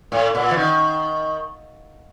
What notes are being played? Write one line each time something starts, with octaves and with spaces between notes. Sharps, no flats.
A2
A#2
E3
D#3